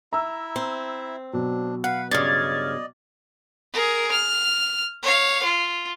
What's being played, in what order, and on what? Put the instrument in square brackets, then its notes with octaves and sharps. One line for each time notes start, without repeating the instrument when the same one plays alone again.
[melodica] E4 E5 [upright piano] A#5 E6
[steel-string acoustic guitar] C4
[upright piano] B2 F#3 [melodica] D4
[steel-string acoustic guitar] B4 [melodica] F5 [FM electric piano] F#5
[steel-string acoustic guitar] G2 C#3 [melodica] D5 D#5 [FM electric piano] F6 G#6 A6
[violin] G#4 A#4
F6
C#5 F5
F4